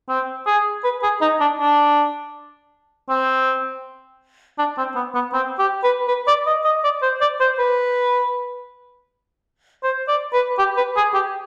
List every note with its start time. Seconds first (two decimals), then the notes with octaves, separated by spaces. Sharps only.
0.09 C4
0.47 G#4
0.84 B4
1.03 G#4
1.21 D#4
1.41 D4
1.59 D4
3.09 C4
4.58 D4
4.78 C4
4.96 B3
5.14 B3
5.33 C4
5.59 G4
5.84 B4
6.08 B4
6.27 D5
6.47 D#5
6.64 D#5
6.84 D5
7.02 C5
7.21 D5
7.40 C5
7.59 B4
9.83 C5
10.08 D5
10.33 B4
10.58 G4
10.77 B4
10.96 G#4
11.14 G4